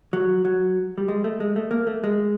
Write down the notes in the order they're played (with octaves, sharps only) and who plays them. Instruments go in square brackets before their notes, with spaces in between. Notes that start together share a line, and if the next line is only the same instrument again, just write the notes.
[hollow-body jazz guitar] F#3
F#3
G3
G#3
A3
G#3
A3
A#3
A3
G#3